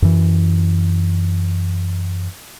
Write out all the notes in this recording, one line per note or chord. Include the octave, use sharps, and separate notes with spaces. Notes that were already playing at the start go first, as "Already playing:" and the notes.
F#2 E3